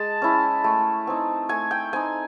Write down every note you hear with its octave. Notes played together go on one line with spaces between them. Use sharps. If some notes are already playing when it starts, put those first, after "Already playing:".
Already playing: G#3 A5
C#4 E4
A3
C4 D#4
A3 G#5
G5
C4 D#4 G#5